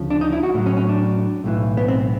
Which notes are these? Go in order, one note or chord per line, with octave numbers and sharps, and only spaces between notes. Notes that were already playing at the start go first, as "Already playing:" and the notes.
Already playing: D2 C#3 F3
D4
D#4
E4
F#4
A2 F#3
C#4
C#4
D4
B1 A2 E3
B3
C4